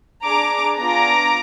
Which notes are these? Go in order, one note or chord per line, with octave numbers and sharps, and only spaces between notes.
D4 G#4 A#5 D6
B3 D4 F4 G#4 A#5 D6